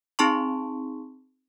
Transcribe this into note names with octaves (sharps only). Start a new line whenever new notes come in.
C4 D#4 G#4 A5 C6 C#6